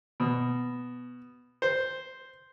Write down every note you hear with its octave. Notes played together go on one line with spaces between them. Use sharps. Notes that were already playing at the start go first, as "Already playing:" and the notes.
B2
C5